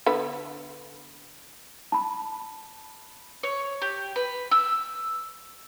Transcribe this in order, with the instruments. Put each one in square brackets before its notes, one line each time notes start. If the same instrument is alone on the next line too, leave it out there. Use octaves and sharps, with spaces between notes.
[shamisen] D3 B3 B5
[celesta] A5 B5
[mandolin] C#5
G4
B4
E6